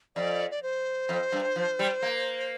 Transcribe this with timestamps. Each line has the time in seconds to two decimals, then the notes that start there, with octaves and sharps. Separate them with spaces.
0.16 F2 D5
0.51 D5
0.63 C5
1.09 F2
1.32 G2
1.56 F3
1.79 G3
2.02 A#3